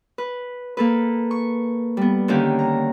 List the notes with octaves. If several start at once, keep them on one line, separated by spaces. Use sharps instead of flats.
B4
A#3 A4 B4
C#6
G3 B3
D3 D#3 A#3 C#4 G4
A#5